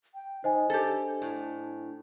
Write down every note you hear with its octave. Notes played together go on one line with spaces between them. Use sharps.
G5
D#4 C5 D#5 G#5
D4 G4 A4
A2